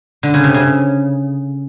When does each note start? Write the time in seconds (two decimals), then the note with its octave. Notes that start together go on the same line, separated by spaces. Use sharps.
0.23 D3
0.34 C#3
0.44 C3
0.54 C#3